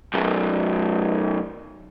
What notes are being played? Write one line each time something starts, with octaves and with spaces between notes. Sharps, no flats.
B1 F#2